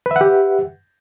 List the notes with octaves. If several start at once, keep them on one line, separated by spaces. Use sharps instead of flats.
G4 B4 E5 F#5